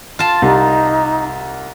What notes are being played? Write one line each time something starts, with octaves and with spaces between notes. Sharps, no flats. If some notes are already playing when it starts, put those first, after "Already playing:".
F4 A5
C2 D#4